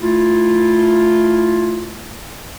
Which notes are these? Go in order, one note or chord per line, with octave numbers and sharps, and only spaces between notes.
A3 E4 F4